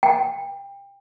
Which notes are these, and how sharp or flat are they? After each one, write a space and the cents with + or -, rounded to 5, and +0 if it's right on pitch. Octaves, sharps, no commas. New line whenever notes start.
G5 +25